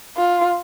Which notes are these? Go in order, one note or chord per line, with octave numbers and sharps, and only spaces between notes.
F4